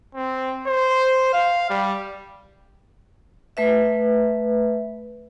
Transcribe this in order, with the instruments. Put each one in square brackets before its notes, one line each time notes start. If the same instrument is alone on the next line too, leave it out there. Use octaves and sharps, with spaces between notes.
[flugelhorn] C4
C5
F5
G3
[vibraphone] A3 B4 E5